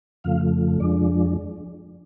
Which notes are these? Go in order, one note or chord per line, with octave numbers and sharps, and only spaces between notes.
F2 C#3 F3 A3 F5
F2 F3 G#3 D4 D5